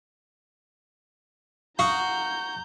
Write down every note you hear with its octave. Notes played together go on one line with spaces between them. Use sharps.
F#4 F5 F#5 A#5 D#6 G6